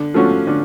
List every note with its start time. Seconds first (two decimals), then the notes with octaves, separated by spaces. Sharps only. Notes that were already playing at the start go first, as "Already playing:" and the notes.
Already playing: D3
0.14 F3 A3 C#4 F#4
0.47 D3